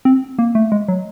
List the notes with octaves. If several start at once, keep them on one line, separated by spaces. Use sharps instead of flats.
C4
A#3
A3
G#3
F#3